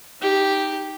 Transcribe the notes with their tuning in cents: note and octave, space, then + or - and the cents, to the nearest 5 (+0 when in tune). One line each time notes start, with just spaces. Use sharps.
D#4 +0 G4 +0